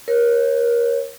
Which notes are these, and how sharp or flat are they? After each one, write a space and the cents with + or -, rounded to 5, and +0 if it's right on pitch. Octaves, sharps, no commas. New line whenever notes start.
A#4 +25 C#5 -20